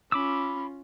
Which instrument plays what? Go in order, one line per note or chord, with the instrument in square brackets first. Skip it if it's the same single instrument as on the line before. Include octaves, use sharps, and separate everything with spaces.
[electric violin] C#4 F4 [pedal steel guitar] B5 D6 E6